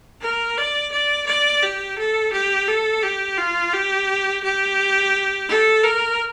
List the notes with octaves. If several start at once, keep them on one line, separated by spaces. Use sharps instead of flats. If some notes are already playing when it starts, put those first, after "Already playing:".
A#4
D5
D5
D5
G4
A4
G4
A4
G4
F4
G4
G4
A4
A#4